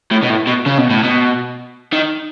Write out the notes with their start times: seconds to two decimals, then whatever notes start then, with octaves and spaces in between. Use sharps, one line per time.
0.11 A2
0.23 B2
0.30 A2
0.47 B2
0.66 C#3
0.78 B2
0.90 A2
1.04 B2
1.93 D#3